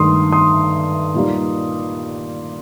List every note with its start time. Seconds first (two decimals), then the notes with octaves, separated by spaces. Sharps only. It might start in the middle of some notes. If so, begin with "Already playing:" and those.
Already playing: G2 D#3 A3 C6 D#6
0.32 C6 D#6
1.14 A#2 G3 A#3 D#4